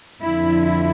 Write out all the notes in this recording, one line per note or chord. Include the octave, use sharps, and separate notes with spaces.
F2 D3 F3 E4
E4